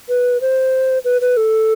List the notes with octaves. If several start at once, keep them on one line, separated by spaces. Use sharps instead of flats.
B4
C5
B4
B4
A4